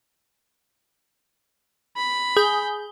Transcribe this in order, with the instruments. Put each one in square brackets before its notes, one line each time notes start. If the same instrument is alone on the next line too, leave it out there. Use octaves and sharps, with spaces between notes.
[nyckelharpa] B5
[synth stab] G#4 G6